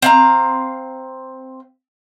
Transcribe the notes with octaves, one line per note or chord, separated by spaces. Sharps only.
C4 F5 A#5